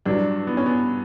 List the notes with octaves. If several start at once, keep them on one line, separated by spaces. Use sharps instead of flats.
G2 F#3 D4
B3
C#4
B3